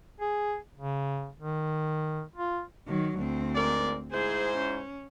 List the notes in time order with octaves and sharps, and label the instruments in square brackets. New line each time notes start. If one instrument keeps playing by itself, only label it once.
[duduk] G#4
C#3
D#3
F4
[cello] D#3 F#3
D2 C4
[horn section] G#2 A#4 D5
[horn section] G#2 E4 C5 [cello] G#4
[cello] C#4